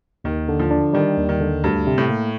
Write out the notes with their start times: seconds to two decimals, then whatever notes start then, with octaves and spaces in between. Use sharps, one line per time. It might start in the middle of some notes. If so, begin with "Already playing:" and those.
0.24 D#2 D#3
0.48 D3
0.60 F3
0.71 D4
0.93 D#3 G3
1.17 D#2
1.29 D#3
1.40 D3
1.64 D2 G2
1.87 C3
1.98 A2
2.09 A#3